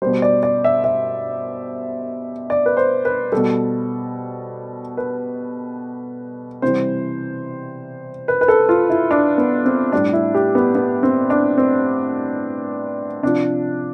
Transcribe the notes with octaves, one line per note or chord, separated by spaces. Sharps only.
B2 G3 C5
D5
D5
E5
E5
D5
B4
C5
B4
B2 G3 A4
B4
C3 E3 G3 C5
B4
B4
A4
F4
E4
D4
B3
C4
A2 G3 D4
E4
G4
B3
B3
C4
D4
C4
C3 F3 D4